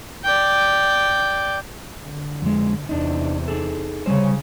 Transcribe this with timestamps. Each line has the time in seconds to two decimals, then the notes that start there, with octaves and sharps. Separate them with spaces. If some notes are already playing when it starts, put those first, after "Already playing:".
0.24 D5 G5
2.03 D3
2.42 F2 G#3
2.89 E2 C3 D4 D#4
3.48 D#4 G#4 A4
4.06 C#3 G3 C#4 C5